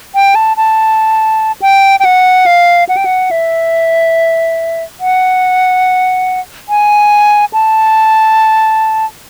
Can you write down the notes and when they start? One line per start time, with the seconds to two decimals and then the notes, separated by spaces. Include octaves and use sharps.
0.15 G5
0.35 A5
0.57 A5
1.62 G5
2.00 G5
2.05 F#5
2.46 F5
2.89 F#5
2.97 G5
3.05 F#5
3.31 E5
5.00 F#5
6.69 G#5
7.53 A5